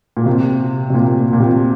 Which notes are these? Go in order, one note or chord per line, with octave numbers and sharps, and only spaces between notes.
A#2
C3
C3
A#2
A#2
A#2
C3